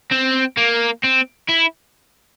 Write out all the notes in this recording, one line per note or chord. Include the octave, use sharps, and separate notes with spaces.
C4
A#3
C4
E4